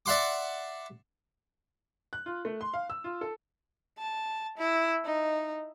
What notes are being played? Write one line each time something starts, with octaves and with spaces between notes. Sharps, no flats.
D5 E5 F#5 C6 D6
F#6
F4
A3
C6
F5
E6
F4
A4
A5
E4
D#4